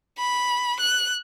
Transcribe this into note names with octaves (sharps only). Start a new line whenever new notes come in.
B5
F#6